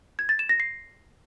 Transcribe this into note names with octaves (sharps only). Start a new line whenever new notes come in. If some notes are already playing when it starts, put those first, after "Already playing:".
G#6
A6
E7
A#6
C7